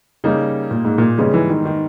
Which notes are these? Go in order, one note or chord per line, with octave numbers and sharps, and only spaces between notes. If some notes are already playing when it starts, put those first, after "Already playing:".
C#3 G3 A#3 D#4
A#2
G#2
A#2
G#2 C#3 G3 B3 D#4
E3
D#3
D#3